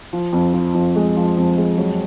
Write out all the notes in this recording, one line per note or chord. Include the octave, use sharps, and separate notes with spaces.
F3
F2
F3
F2
G#3
F3
F2
G#3
F#3